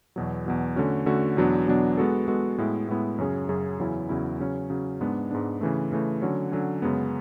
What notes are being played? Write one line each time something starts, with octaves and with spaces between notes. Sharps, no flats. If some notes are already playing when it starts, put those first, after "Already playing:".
E2 B2 F#3
E2 B2 F#3
D3 A3 C#4 F#4
D3 A3 C#4 F#4
E2 B2 F#3 B3 D4
E2 B2 F#3 B3 D4
G#3 B3 F#4 A4
G#3 B3 F#4 A4
A2 G#3 B3 E4
A2 G#3 B3 E4
F#2 C#3 F#3 C#4 G#4
F#2 C#3 F#3 C#4 G#4
E2 C#3 F#3 C#4 E4
E2 C#3 F#3 C#4 E4
C#3 F#3 C#4
C#3 F#3 C#4
G#2 G#3 B3 D4
G#2 G#3 B3 D4
C#3 E3 A3
C#3 E3 A3
D3 F#3 C#4
D3 F#3 C#4
F#2 C#3 G#3 B3